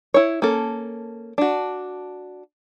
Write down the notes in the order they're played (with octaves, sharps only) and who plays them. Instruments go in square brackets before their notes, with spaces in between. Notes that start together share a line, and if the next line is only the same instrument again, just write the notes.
[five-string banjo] E4 C#5
A#3 C#4 A4
D4 F#4